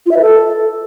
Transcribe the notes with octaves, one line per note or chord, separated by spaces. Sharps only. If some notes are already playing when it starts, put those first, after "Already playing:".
F4
E5
B4
A4